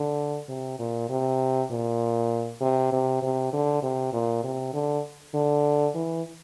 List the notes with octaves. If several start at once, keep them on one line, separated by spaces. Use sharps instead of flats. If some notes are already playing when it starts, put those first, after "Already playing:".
Already playing: D3
C3
A#2
C3
A#2
C3
C3
C3
D3
C3
A#2
C3
D3
D3
E3